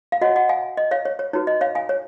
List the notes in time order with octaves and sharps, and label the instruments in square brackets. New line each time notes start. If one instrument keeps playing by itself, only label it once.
[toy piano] F5
F#4 D#5 F#5
C#5
D#5 F#5
F5 G#5
D#5
C#5 F5
C#5
C#5
D#4 F#4 B4 C#5
D#5
C#5 F5
F5 G#5
C#5